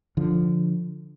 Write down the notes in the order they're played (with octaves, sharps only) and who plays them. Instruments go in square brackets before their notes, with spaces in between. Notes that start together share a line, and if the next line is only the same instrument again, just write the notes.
[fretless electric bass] D3 F3